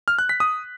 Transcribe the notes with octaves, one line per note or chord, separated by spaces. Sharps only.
F6
F#6
B6
D#6